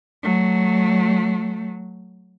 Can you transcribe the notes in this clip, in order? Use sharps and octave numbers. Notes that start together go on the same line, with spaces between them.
F#3 A3